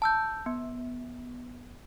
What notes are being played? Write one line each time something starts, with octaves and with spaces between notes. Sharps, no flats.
A5 E6 G6
B3